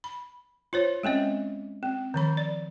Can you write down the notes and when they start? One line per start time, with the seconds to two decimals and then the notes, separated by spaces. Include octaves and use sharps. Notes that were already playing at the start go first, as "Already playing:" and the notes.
0.04 B5
0.73 F4 C5 C#5
1.03 G#3 C4 C#4 D#5
1.83 C4
2.14 D#3 F3 B5
2.37 D5